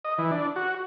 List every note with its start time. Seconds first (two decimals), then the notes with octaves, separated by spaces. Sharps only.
0.05 D#5
0.18 E3
0.31 D4
0.56 F#4